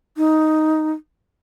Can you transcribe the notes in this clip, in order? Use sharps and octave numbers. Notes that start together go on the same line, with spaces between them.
D#4